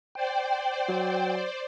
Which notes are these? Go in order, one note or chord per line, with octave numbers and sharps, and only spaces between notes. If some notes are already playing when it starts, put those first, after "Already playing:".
C5 D5 G5
F#3